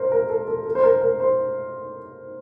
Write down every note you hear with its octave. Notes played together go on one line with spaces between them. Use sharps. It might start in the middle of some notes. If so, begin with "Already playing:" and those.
Already playing: A#4 C5
A#4
A4
A4
A4
C5
A#4
A#4
C5